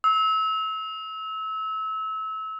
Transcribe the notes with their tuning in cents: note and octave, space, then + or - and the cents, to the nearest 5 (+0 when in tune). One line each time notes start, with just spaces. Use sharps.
E6 -30